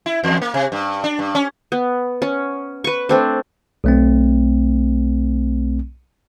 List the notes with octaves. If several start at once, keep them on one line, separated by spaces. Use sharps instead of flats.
E4
E2
A#3
C3
G2
D4
G2
C#4
B3
C#4
B4 C#6
A3 C4 D4
B1 A3 C4